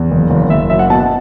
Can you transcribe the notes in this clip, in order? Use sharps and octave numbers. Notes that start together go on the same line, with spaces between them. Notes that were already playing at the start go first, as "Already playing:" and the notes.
Already playing: E2
F#1
F#1
F#1 E5
F#3 E5
F#5
B2 A5
F#5